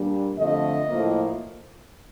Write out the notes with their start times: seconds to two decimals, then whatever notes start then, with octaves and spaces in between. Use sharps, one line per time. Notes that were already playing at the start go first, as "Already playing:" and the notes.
Already playing: A#2 G3 D4
0.38 F2 D3 F3 A3 D#5
0.87 A2 F3 A#3